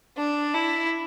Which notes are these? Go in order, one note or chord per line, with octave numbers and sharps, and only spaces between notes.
D4
E4